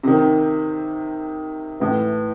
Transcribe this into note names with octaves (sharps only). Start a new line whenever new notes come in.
C3 D#3
A2 E3